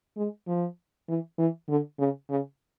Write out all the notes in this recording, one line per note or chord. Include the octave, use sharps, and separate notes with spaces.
G#3
F3
E3
E3
D3
C#3
C#3